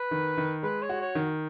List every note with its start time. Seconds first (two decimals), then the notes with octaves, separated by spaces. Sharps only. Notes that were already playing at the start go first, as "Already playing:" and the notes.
Already playing: B4
0.11 D#3
0.37 D#3
0.63 G#3 B4
0.82 C#5
0.89 F#4
1.01 C#5
1.15 D#3